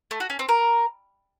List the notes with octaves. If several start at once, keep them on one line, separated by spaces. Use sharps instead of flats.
A3
F#4
C#4
C4
A#4